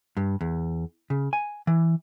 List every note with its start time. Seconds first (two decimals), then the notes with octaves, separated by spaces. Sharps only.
0.17 G2
0.41 E2
1.10 C#3
1.33 G#5
1.67 E3